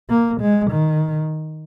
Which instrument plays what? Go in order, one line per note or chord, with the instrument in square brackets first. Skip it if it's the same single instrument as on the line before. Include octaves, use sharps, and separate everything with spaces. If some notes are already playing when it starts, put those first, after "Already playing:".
[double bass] A#3
G#3
D#3